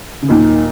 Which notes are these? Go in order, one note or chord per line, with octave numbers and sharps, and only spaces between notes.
C#3
D#2 A#2 D#3 F#3 A#3 D#4